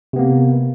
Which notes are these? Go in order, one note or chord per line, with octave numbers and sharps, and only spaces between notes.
C3 A#3 B3